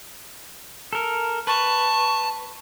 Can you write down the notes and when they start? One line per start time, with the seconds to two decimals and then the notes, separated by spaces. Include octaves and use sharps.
0.93 A4 A#4
1.47 B4 A5 C#6